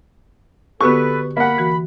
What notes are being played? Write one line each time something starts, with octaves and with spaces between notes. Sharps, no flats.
D3 B3 F#4 G4 A4 B4 C#6
A#3 F#5 B5
E3 F#4